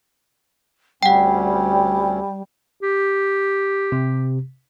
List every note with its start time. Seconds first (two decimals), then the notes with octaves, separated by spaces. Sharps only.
1.03 D2 G3 C4 C#4 F#5 G5
2.82 G4
3.92 C3